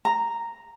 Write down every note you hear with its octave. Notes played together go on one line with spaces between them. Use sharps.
A#5